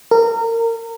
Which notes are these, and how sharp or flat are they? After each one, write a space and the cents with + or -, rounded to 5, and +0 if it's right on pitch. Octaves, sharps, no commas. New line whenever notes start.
A#4 -25